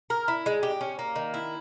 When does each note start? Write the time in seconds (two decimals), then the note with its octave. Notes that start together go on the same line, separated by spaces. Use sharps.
0.10 A#4
0.28 E4
0.46 G#3
0.63 G4
0.81 C#4
0.99 A#3
1.16 D#3
1.34 E4